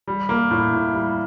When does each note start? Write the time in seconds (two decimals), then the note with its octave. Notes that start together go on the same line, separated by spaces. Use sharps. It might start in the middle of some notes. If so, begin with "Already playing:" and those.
0.08 G3
0.29 A#3
0.51 A2
0.73 A2
0.94 G3